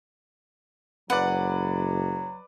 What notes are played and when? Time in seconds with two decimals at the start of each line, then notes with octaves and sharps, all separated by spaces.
1.10 F#1 F#3 B4 D5 F#5